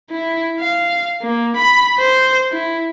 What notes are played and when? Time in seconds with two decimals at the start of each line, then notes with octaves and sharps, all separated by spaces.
0.11 E4
0.60 F5
1.22 A#3
1.56 B5
1.99 C5
2.52 E4